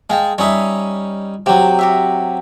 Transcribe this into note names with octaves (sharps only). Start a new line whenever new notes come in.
G#3 F5 G5 A5
G3 C#4 D#4 C#5 E5
C3 F#3 G4
F#4 G4 E5